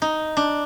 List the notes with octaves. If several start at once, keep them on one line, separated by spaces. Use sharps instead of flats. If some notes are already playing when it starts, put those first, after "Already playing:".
D#4
D4